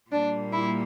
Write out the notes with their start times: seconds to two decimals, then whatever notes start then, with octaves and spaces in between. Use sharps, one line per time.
0.11 A#2 G3 A#3 D4
0.52 E4